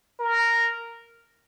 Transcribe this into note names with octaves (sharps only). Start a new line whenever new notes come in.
A#4